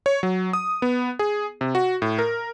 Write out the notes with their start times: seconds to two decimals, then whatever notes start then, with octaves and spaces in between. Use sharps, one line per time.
0.06 C#5
0.23 F#3
0.53 D#6
0.82 B3
1.19 G#4
1.61 C3
1.75 F#4
2.02 A2
2.19 A#4